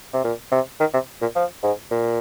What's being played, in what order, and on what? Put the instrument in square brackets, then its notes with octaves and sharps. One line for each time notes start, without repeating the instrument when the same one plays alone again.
[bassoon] C3
A#2
C3
D#3
C3
A#2
F3
G#2
A#2